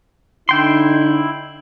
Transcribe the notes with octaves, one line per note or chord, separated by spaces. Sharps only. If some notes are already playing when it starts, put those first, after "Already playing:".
D3 D#4 E4 G5 C6